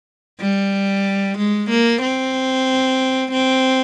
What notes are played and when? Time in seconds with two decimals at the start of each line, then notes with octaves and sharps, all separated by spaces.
0.40 G3
1.38 G#3
1.70 A#3
2.02 C4
3.32 C4